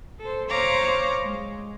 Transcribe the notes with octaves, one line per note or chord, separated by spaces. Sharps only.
A4 C5
C5 C#5 F5 A#5 C#6 D6
G#3